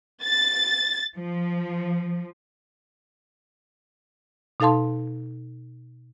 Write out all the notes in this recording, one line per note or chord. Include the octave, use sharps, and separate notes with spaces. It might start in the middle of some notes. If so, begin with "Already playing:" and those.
A6
F3
B2 D#4 A4 F5 A5 C6